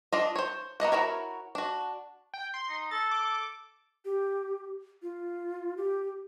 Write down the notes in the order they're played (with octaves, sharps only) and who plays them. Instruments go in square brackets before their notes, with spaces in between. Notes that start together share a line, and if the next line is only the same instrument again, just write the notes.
[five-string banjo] D4 F4 D#5
C5 C#5
A#3 B3 D#5 F#5
E4 F#4 A#4 C#5
D4 F#4
[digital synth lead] G5
C6
[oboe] D#4
[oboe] A4 [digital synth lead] A6
[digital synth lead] D6
[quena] G4
F4
G4